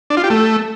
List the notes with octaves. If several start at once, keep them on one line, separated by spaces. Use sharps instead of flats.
D4
F4
G4
A3